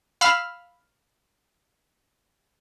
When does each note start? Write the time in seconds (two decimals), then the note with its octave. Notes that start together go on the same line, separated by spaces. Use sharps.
0.21 F5 B5 E6 F6